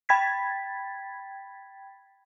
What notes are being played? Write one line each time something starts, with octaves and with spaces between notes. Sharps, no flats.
G5 B5 G#6 A6 B6